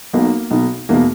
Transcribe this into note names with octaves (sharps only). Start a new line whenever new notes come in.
B1 B2 A#3
B1 B2
E2 B2 A#3